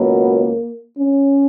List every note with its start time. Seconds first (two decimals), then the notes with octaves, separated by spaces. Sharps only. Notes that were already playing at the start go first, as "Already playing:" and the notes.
Already playing: C#2 B2 F#3 A#3
0.98 C#4